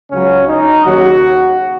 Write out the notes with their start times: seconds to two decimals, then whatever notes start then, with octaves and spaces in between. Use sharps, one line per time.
0.11 C#2 C#3 F#3 C#4
0.48 D#4
0.83 D#2 C#3 F#3 F#4